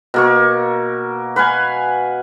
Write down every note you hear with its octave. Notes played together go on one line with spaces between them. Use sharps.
B2 A#3 C#6
B4 F5 F#5 G#5